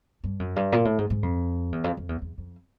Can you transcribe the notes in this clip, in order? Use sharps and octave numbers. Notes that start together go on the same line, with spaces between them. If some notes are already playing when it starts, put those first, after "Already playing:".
G2
F#2
G2
A#2
A2
G#2
G#2
F2
E2
F2
F2
E2
E2
F2